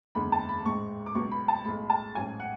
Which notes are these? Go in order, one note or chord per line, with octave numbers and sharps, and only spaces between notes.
F#1 E2 D3 G#3 B5
A5
B5
A1 G#2 G#3 C#6
D6
C#2 B2 F#3 B3 C#6
B5
A5
B1 A2 G#3 B5
A5
A1 G#2 F#3 C#4 G#5
F#5